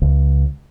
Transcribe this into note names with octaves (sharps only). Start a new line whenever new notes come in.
C#2